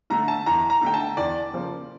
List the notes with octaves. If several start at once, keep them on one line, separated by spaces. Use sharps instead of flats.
D3 A3 A#5
A5
E2 A#5
A#5
D3 A3 G5
A5
E2 D5
C#3 F3 A#3